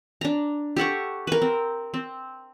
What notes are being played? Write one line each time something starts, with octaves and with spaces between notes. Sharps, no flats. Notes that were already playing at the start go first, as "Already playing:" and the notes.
D4 A#5
G4 A4 F#5 C#6
A#4 B4
C4
C4